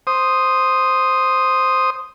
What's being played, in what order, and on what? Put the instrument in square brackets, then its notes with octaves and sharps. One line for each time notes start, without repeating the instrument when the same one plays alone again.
[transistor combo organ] C5 D#6